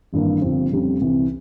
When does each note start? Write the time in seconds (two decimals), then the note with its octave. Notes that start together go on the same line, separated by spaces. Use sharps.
0.13 G#1 G2 E3 G3 A#3
0.42 G1 G2 F3 C4
0.72 F2 C#3 G3 C4
1.01 C2 C3 E3